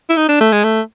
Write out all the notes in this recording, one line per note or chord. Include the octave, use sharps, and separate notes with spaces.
E4
D#4
D4
A3
G#3
A3